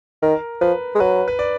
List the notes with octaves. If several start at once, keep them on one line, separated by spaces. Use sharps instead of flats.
D#3 A#4
F3 B4
G#3
F#3 B4
B4
D5